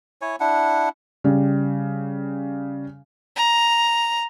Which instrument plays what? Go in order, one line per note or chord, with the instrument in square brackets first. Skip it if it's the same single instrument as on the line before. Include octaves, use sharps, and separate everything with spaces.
[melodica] E4 C#5 G#5
D4 E4 F#5
[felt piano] C#3 G3
[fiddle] A#5